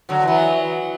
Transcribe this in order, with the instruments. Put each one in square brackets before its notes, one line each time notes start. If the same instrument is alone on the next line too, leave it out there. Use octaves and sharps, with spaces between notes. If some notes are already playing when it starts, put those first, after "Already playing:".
[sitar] D3 F#3
[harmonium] E3
[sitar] F#3 B3